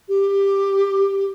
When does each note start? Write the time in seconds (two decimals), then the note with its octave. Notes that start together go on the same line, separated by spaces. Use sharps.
0.08 G4